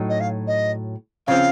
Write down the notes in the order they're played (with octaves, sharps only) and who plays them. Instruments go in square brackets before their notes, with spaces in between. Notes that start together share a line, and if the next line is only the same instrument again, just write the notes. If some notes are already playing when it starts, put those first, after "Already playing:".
Already playing: [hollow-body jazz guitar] A2 F#3 D#4
[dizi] D#5
F5
D#5
[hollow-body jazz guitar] C#3 F3 C4 [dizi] F5